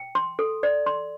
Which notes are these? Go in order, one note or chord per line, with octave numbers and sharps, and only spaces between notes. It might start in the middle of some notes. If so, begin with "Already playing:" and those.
Already playing: G5
C6
A4
D5
C6